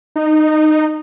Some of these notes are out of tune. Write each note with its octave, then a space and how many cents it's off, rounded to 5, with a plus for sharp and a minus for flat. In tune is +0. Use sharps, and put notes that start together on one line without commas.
D#4 -15